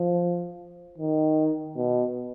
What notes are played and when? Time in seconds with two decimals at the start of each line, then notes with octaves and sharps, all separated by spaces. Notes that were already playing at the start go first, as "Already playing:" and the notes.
Already playing: F3
0.98 D#3
1.77 B2